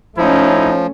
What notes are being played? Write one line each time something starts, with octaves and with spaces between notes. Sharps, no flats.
F3 A3 C#4 D#4 E4